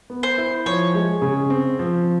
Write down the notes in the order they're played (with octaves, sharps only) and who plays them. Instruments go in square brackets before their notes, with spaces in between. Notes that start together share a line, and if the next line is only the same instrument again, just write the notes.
[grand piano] B3
[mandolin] C5
[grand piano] E4
[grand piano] F3 [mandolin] C#5
[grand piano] G#3
C#3
C4
F3